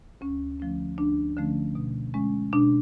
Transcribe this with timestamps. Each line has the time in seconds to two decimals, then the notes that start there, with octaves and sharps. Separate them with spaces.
0.21 D2 C#4
0.60 D3 F3 A3 C#4
0.98 D2 D4
1.37 D3 F3 A3 C#4
1.75 B2
2.14 G#3 C#4
2.53 B2 D4